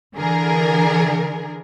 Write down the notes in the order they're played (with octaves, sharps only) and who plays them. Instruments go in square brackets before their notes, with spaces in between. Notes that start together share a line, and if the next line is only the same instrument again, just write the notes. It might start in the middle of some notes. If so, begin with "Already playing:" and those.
[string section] D3 E3 G#4 A#4